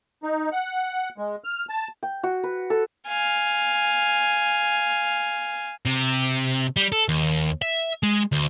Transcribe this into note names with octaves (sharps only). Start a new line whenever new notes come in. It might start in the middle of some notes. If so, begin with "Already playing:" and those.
D#4
F#5
G#3
F6
A5
G5
F#4
B4
A4
F5 G#5
C3
G3
A4
D#2
E5
G#3
D2